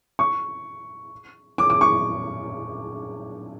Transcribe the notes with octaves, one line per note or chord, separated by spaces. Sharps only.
C#6
D6
D6
C#6